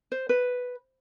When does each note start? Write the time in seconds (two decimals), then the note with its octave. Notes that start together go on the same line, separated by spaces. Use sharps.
0.12 C5
0.29 B4